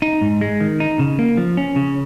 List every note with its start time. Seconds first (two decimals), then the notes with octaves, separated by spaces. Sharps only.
0.02 D#4
0.21 G#2
0.41 G#3
0.60 D#3
0.80 D#4
0.99 C#3
1.19 A#3
1.37 F3
1.57 C#4
1.76 C#3